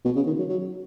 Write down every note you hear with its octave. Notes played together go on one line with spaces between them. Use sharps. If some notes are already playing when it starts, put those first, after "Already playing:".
B2
C#3
D#3
F#3
F#3